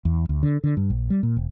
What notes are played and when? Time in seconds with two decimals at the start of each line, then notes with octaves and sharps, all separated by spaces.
0.05 E2
0.29 D2
0.43 D3
0.64 D3
0.77 G2
0.90 A#1
1.10 G3
1.23 A#2
1.37 E1